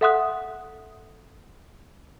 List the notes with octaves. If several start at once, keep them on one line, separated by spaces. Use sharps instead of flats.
A4 E5 F#5 C6 D#6 F#6